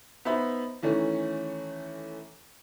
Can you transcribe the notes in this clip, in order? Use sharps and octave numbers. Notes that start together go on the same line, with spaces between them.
B3 D#4 C5 E5 B5
D#3 E3 A3 C#4